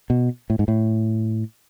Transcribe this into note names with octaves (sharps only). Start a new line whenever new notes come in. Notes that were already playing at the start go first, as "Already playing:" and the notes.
B2
A2
G#2
A2